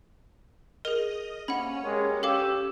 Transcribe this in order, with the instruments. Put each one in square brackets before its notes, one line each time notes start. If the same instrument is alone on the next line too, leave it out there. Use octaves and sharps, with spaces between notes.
[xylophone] G#4 A#4 [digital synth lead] D#5
[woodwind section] C3 A#3 [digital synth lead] C#4 [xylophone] F#5 B5
[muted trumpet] G#3 [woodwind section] A#3 G4 C#5
[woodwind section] G2 B2 E6 [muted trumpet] G4 [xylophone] A4 F5 D6